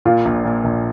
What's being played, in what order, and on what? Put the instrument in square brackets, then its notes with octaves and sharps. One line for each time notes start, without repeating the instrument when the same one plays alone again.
[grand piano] A#2 [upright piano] F4
[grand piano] A#1
A#2
A#1